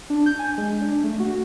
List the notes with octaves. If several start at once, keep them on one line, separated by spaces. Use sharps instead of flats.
D4
G6
G#5
G#3
D4
A3
F#4